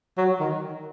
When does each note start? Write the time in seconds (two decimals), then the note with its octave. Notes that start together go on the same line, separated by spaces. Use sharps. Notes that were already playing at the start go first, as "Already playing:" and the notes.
0.18 F#3
0.40 D#3